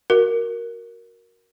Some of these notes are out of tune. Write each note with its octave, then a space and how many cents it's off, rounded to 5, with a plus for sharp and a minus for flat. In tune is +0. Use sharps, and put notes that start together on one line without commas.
F#4 +0 A#4 +0